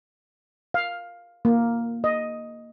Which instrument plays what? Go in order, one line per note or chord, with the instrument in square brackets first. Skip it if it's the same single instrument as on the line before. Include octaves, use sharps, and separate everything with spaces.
[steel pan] F5
A#3
D#5